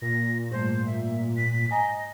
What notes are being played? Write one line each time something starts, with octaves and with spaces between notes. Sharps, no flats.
A#2 A#6
G#2 G3 A3 C5
E5
B6
D#5 G#5 A#5